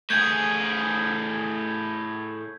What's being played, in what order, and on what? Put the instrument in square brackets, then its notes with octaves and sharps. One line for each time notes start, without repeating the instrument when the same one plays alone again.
[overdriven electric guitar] A2 G#4 [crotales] G6 G#6